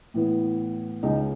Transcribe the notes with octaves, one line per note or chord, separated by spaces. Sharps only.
A2 E3 B3
C#2 C#3 G#3 C#4 D#4